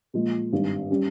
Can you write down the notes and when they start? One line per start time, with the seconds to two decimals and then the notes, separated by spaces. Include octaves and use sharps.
0.14 A#2 F3 G#3
0.52 G#1 G2 G3
0.91 G3 C#4